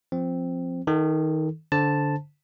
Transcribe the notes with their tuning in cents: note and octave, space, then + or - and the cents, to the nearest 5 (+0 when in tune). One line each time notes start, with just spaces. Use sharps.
F3 +0 C4 +0
D#3 +20 A4 +0
D3 -15 C5 +0 A5 +0